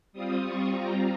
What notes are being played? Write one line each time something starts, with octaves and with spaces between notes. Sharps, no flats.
G3 C4 F4 D#6
C#6
G3 C4 F4 A#5